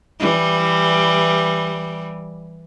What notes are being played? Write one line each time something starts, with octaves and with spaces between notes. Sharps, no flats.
E3 G3